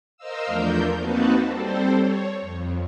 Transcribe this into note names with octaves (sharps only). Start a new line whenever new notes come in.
A#4 C5 D#5 F5 E6
E2 F3 A3 D4 A#4 G6
A#3 C4 D#4 F#4 B4 A5
G3 C4 A4 C5
C#5
F2